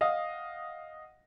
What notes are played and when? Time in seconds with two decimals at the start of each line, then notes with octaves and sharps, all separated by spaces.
0.01 D#5 F5 F#5 D#6